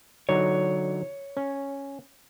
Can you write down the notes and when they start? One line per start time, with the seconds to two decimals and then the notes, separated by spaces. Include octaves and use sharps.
0.29 D3 F#3 D#4 C#5
1.37 C#4